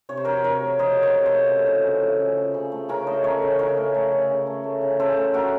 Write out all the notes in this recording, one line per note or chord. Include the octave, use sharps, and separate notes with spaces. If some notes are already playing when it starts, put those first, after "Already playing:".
C3 C#5
C5
F#3 A#4 C#5
C3 A#4 C#5
A3
C3 C5 D#5
F#3
A#4 C#5
C3
A4 C5
A3
C#3
F3
C#3
A3
C#3
F3
C#3
A3
C#3 A#4 C#5
A3 C5 D#5
A3 A#4 C#5
C#3
C#3 A#4 C#5
A3
A3
C#3
C#3
A3
A3
C#3
C#3 A4 C5
A3
A3 F#4 A#4